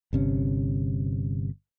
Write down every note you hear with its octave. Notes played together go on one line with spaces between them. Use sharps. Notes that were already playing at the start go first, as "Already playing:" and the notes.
G1 C3 C#4